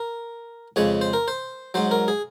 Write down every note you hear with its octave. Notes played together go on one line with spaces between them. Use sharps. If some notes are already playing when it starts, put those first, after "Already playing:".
Already playing: A#4
F2 C#3 G#3 C#5
C5
A#4
C5
G#2 F#3 C5
A#4
G#4